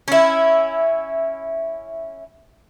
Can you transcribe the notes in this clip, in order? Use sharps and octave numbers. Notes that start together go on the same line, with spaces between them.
C#4 E4